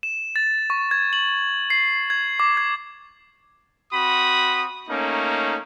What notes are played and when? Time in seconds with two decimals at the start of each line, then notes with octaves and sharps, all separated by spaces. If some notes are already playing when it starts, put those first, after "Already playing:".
0.03 E7
0.36 A6
0.70 C#6
0.91 G#6
1.13 F#7
1.70 C7
2.10 G#6
2.40 D6
2.57 G#6
3.93 C4 F#4 B5 D#6
4.90 A3 A#3 C#4 D#4